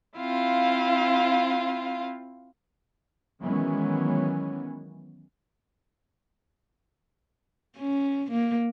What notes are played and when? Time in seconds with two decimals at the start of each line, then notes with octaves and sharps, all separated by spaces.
0.18 C4 E4 F4 F5
3.41 D#3 E3 F#3 G#3 B3 C#4
7.78 C#4
8.32 A#3